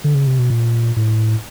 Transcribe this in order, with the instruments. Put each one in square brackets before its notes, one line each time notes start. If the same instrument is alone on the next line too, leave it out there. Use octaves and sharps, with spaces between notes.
[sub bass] D3
C#3
C3
B2
A#2
A2